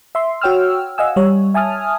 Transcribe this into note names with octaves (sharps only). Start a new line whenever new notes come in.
E5 C6
F#4 C#5 G5 E6 F6
D#5 F5 F#5 G#5 E6
G3 C#5
E5 G#5 A5 D#6 F6